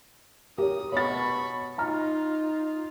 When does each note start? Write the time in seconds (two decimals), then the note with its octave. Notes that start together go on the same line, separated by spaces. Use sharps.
0.58 G4 A#4 C#5 D#6
0.92 B2 C#5 B5 C#6 A6
1.78 D#4 F4 A#5 F6